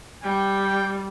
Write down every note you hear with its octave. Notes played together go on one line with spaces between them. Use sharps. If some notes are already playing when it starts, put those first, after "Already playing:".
G3 G5